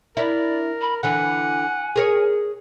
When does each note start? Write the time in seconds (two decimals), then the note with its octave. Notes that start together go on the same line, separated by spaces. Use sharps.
0.17 D4 E4 A#4 D5
0.81 B5
1.03 D3 E3 D4 F#5 G#5
1.96 G#4 A#4 C#5